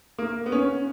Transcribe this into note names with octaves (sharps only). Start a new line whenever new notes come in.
A#3
B3
C#4